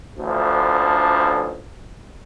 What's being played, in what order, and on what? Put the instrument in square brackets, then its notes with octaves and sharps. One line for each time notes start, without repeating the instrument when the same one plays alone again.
[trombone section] A1 D2 D3 F3